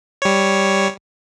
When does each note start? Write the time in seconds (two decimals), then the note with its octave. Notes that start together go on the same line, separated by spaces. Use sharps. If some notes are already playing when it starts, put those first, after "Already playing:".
0.22 G3 C#5